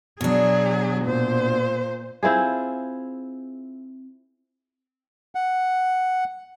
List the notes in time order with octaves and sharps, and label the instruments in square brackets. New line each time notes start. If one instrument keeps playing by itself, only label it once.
[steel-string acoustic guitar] B2 D4 [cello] F#3 G#4
[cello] A#2 C5
[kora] C4 E4 F4 G#4
[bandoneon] F#5